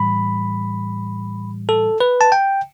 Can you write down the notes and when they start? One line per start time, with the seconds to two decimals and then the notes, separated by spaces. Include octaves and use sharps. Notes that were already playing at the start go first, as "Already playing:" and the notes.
Already playing: A2 E3 G3 B5
1.69 A4
2.00 B4
2.21 A5
2.32 G5